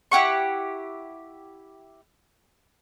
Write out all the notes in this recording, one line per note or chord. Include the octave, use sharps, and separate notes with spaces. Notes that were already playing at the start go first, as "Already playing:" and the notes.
E4 G4 F#5 C#6